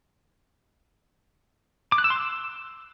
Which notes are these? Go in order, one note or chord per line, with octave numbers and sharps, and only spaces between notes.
D6
F#6
E6
C6
E6